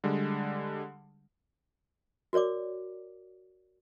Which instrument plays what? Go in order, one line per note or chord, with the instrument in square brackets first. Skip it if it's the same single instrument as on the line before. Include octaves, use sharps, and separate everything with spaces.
[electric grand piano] D3 G3 G#3
[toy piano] F#4 A#4 C#5 D5 D6